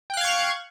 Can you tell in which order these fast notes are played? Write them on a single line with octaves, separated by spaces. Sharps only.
G5 F#6 F5 G#6 C#6